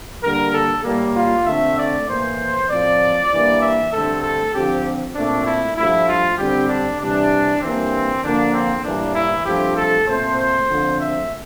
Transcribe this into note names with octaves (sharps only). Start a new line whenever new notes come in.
D3 G3 A#3 A#4
A4
A2 G3 A#3
F4
D3 A3 C4 E5
D5
A2 E3 A#3 C5
A2 F3 C4 D5
G2 E3 A#3
E5
G2 D3 A3 C4 A4
A4
D3 F3 C4 G4
A#2 A3 C4 D4
E4
G2 F3 A3 E4
F4
D3 G3 C4 G4
D4
C3 E3 G3 D4
G2 E3 A#3 C4
D3 F3 A#3 D4
C4
A2 E3 G3 A#3 D4
E4
G2 F3 A3 C4 G4
A4
A#2 A3 C4 C5
D3 F3 A3 C4
E5